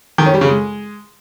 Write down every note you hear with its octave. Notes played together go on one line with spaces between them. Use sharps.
D#3
C#4
G3
C#3
G#3